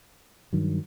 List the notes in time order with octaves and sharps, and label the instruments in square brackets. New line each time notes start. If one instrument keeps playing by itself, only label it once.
[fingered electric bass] G2 D#3 F#3